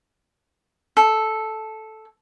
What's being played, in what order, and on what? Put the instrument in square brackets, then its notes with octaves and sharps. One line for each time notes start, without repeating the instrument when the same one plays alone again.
[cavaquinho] A4